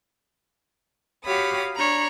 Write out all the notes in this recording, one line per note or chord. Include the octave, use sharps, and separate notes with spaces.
F#4 G4 C#5 F5 B5 D#6
D4 C#5 A#5 B5